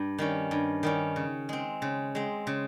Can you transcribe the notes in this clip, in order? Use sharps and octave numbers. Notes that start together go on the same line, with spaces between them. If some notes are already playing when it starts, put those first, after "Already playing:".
Already playing: G2
D#3 G3 C#4
G2
D#3 G3 C#4
C#3
G#3 C4
C#3
G#3 C4
C#3